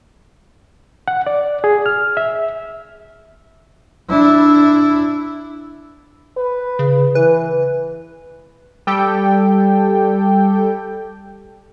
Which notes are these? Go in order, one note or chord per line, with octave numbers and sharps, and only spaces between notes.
F#5
D5
G#4
F6
E5
D4 E4
B4
C#3
E3 B4
G3 G4 A4 G5